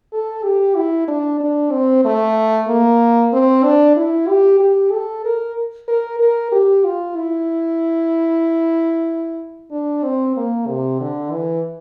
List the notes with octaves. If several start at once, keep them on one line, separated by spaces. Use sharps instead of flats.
A4
G4
E4
D4
D4
C4
A3
A#3
C4
D4
E4
G4
G4
A4
A#4
A#4
A#4
G4
F4
E4
D4
C4
A#3
C3
D3
E3